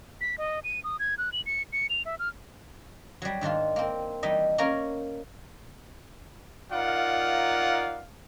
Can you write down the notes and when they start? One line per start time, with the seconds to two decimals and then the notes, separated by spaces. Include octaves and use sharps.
0.21 B6
0.38 D#5
0.64 D#7
0.84 D#6
0.99 G#6
1.18 F#6
1.33 F#7
1.46 C#7
1.73 C#7
1.90 F7
2.05 E5
2.19 F6
3.22 F#3 G3
3.41 G#2 D#3 D4 F4
3.76 A#3 C4
4.23 E3 G3 D#4 D#5 E5
4.58 A#3 C#4 A#4 A#5
6.72 D#4 F4 A#4 D5 F5 F#5